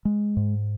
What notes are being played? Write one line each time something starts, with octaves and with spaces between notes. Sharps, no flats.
G#3
G#2